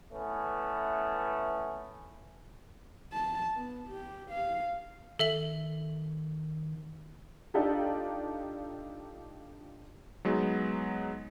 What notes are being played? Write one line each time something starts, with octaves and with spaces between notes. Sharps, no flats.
E3 A3 B3 C#4
A5
B3
G4
F5
D#3 A4 E5 F#7
D4 D#4 F4 G4 A4 D5
F#3 G#3 B3 D#4